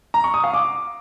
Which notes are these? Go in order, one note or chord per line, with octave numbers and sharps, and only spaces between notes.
A#5
C#6
D#6
F5
D6